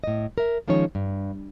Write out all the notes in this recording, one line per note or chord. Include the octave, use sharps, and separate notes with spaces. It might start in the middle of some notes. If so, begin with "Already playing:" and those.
A2 D#5
A#4 E5
D#3 F3 G#3 C#4 D#4 C#5
G2